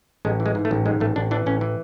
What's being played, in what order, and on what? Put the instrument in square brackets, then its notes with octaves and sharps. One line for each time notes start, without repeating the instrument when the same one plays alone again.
[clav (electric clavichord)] A1 G#3
E3
G#3
G#2
A3
A1
G#2 G#3
A1 A3
A1 D4
E3 D4
A1 C#4
E3